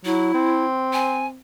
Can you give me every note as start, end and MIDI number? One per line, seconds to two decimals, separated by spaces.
0.05 0.31 54
0.05 0.65 64
0.34 1.41 60
0.93 1.26 80